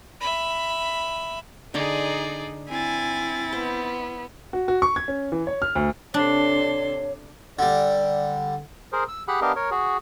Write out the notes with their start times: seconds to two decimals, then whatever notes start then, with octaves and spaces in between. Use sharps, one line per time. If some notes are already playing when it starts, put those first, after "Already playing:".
0.20 E5 B5
1.74 D3 D#4 G#4 D5 A#5 C6
2.69 C4 E4 G#5 A6
3.53 B3 C5
4.53 F#4
4.68 F#4
4.82 C#6
4.96 G#6
5.08 C#4
5.32 E3
5.47 C#5
5.62 F6
5.75 D2
6.14 C3 D4 A4 C#5 C6
7.59 D3 G3 D5
8.92 G#4 A#4 C5
9.08 E6
9.28 G4 G#4 F#5 B5 F#6
9.41 B3 D4 G4 A#4 D#5 F5
9.56 A#4 C#5
9.71 F#4 G#4